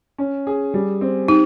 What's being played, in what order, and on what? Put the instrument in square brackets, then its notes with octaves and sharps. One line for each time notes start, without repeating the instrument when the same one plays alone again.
[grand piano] C#4
G#4
G3
C4
[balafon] D#4 [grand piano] G4